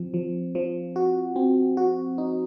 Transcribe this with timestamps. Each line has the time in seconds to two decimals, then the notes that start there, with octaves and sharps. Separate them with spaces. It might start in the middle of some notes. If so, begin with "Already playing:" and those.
Already playing: F3 C4
0.14 F3
0.55 F3
0.96 F#4
1.36 C4
1.77 F#4
2.18 D#4